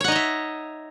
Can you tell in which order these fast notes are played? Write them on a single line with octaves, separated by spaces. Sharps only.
C#5 F#5 D#4 D#5 E5